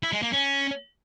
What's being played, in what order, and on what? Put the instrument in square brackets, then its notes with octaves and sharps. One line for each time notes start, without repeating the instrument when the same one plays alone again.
[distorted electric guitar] E4
G#3
A#3
C#4